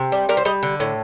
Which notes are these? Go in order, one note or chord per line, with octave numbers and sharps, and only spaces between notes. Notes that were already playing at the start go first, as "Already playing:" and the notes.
Already playing: C3
G3
G3 A#4
C5
G3 D#5
D3
A2